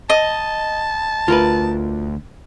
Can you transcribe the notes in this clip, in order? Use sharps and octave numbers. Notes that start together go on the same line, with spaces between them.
D#5 A5
D2 F4 A#4 B4